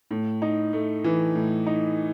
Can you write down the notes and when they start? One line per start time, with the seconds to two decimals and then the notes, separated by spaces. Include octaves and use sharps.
0.11 A2
0.42 D#4
0.73 A3
1.04 E3
1.35 A2
1.66 D#4